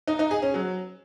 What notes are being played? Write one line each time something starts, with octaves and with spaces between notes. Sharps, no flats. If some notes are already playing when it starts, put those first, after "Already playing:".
D#4
D#4
G#4
C#4
F#3